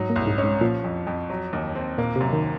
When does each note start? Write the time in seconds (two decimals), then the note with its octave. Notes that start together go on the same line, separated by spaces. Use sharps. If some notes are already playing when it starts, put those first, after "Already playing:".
Already playing: G#2 F#3 D#4
0.10 A#2
0.16 C2
0.27 G#2
0.38 C#4
0.44 G#2
0.61 A#2 F3
0.84 F2
1.07 F2
1.30 F#3
1.53 D#2
1.75 C4
1.98 A#2 A#3
2.16 F#2 C3
2.33 D#3